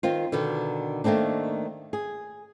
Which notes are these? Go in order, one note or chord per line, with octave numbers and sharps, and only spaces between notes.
D#3 C4 F4
B2 D3 D#3
D#3 A3 A#3 C4 D4
G#4